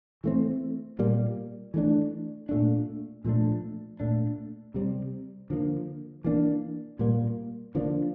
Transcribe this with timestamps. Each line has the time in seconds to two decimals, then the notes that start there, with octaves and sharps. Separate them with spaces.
0.24 E3 A3 C4
0.99 A#2 G3 A#3
1.74 E3 A3 D4
2.49 A#2 A3 D4
3.24 A#2 F3 A3 D4
4.00 A#2 A3 D4
4.74 C3 G3 C4
5.50 D3 F3 A#3
6.24 E3 A#3 D4
6.99 A#2 G3 A#3
7.75 D3 F3 A#3 D4